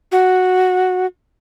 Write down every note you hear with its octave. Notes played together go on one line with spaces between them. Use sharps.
F#4